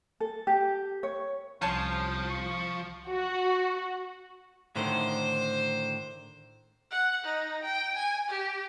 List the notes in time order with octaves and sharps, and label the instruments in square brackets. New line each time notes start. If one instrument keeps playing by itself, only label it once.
[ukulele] A4
G4
C#5
[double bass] C2 [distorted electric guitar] F3 [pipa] C#4 C#5 A5 [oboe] C5
[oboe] C#6
[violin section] F#4
[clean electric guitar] A2 D3 D#3 [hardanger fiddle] C5
[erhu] F#5
D#4
G5
G#5
G4